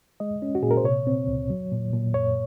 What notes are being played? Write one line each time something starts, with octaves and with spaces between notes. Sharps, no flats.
G#3 D#5
C#4
F#4
A#2 G#4
A#4
C5
C3 C#5
C4
C#2
F#3
A#2
A#2
F#2 C#5